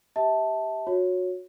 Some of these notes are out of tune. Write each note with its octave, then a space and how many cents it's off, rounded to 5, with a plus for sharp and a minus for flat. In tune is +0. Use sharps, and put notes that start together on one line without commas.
G4 +0 E5 -30 A5 +0
F#4 -25 C#5 +0